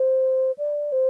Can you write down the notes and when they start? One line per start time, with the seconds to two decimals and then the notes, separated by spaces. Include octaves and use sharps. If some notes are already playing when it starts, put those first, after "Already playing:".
Already playing: C5
0.58 D5
0.92 C5